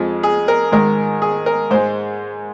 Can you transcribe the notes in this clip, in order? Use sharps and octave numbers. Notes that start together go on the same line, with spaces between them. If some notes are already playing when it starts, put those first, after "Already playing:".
Already playing: F2 F3 G#3
G#4
A#4
G#2 D#3 G#3 A#4
G#4
A#4
G#2 G#3 C5